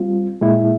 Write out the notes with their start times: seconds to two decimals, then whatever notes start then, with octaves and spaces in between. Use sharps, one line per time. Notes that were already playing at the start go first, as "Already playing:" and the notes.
Already playing: G3 C4 F4
0.41 A#2 G#3 E4